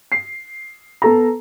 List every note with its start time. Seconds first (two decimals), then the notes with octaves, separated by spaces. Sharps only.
0.12 C7
1.02 B3 A4 A#5